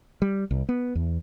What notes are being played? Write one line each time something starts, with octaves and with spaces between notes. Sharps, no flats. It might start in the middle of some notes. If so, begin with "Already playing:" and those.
G3
C2
B3
E2